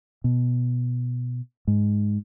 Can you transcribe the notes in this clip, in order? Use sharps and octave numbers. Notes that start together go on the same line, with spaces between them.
B2
G#2